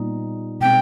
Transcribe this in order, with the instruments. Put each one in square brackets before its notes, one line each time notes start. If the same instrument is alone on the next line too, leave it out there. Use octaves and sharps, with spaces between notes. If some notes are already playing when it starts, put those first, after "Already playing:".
Already playing: [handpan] A#2 G3 B3 D#4
[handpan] B2 G#3 C4 [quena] G5